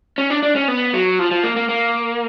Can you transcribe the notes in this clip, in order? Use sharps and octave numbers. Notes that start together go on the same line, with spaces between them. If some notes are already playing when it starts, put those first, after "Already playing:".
C#4
D4
D4
C#4
B3
F#3
F3
F3
A#3
A#3
A#3